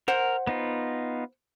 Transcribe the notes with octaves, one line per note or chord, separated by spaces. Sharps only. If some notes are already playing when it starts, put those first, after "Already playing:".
A#4 C5 F#5
B3 D#4 F4